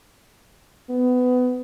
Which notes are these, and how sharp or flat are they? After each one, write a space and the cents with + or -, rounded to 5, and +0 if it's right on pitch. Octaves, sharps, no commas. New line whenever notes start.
B3 +20